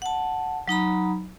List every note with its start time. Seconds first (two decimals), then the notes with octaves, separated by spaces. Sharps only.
0.02 F#5 A5
0.68 F#3 D#4 A#5 B5